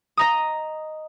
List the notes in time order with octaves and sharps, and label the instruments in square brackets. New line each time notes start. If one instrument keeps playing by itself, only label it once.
[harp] D#5 A#5 D#6